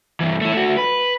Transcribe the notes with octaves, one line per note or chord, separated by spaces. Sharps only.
G2 E3
A3 E4
A3 F#4
B4